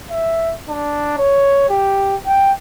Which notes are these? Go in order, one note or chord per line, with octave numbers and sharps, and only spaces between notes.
E5
D4
C#5
G4
G5